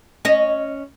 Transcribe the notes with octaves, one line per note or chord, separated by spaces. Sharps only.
C#4 D#5